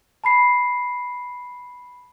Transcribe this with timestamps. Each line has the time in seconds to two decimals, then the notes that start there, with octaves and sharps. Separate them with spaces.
0.24 A5 B5 C7